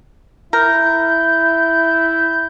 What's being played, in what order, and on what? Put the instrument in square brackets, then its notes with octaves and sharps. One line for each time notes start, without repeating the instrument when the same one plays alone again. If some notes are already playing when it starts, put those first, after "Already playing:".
[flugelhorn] E4 [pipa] A#4 [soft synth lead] G6